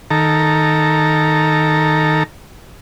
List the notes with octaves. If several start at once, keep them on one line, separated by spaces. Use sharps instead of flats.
D#3 A4 A#5